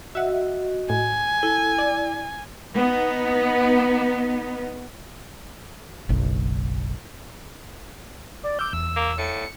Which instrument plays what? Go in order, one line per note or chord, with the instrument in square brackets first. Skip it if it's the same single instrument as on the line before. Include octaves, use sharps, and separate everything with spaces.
[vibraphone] F#4 D#5 [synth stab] E5 F#5
[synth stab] A2 [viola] G#5
[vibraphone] E4 [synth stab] A4
[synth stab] D5
[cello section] B3 D#4
[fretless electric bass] F#1 B1
[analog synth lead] D5
[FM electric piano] D6 E6 F6 [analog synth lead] G6
[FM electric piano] E2 [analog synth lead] E6
[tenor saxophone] A#3
[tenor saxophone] A2 [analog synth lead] C#7